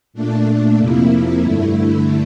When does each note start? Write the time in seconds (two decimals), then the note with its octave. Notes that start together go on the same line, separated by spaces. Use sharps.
0.13 A#2 A3 D4
0.77 F2 C3 F3 A#3 E4
1.41 G2 D3 A3 E4